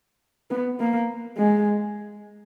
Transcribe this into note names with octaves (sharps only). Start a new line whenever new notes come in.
B3
A#3
G#3